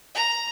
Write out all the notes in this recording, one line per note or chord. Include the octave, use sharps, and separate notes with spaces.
A#5